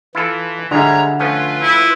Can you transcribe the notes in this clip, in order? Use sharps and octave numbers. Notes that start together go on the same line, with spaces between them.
E3 E4 F4 A4
D3 G3 G#3 C#5 E5 A#5
F3 A3 C#4 F4 B4
E4